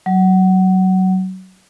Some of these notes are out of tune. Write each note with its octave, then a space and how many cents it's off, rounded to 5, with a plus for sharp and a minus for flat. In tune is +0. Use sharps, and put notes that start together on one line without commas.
F#3 +20